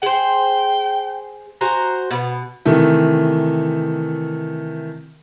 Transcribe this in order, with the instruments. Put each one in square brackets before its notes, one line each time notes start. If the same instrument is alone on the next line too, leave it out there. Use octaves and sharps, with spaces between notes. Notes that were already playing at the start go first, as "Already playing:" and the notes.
[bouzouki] G#4 C5 [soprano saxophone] G5
[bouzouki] F#4 C5 G#5 [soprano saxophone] A#5
[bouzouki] B2 [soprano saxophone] B3
[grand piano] C3 D#3 E3 A3